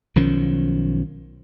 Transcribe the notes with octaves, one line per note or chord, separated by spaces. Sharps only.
B1 D#3 F3 C#4